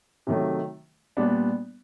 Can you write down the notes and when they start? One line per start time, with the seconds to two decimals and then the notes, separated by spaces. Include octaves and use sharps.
0.27 C3 D#3 F#3 A3
1.17 A#2 G3 B3 D4